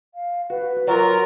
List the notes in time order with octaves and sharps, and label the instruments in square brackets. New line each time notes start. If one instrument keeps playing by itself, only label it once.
[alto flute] F5
[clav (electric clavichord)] F#4 [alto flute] B4
[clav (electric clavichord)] F#3 [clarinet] F4 [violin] A#4